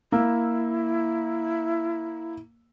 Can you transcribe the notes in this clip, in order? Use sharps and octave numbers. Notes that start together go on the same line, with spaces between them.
A#3 E4 E6